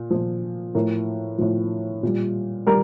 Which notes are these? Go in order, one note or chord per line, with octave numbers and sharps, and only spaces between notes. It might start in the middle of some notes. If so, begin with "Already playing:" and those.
Already playing: A#2
A#2 F3
A2 F3 A#4
A2 F3
A#2 G3
G3 A#4